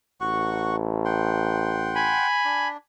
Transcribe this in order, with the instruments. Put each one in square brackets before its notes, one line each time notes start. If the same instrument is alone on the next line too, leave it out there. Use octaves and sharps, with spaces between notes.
[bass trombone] A1 [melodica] F#4 F#5 C#6
[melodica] F#5 G5 C6
[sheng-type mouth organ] G#5 B5
[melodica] D4